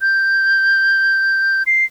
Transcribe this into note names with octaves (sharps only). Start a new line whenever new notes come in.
G6
C7